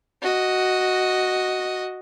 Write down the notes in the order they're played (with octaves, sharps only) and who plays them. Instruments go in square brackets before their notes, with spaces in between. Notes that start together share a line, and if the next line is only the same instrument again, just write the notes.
[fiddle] F#4 D#5